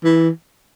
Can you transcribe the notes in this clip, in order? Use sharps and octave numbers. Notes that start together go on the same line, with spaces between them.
E3